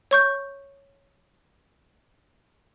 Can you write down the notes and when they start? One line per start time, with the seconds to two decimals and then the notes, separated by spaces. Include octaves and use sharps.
0.11 C#5 C#6 G6